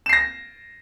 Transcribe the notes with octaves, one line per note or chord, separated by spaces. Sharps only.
A#6 C7 E7